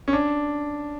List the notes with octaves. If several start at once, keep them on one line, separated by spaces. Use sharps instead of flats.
C#4
D4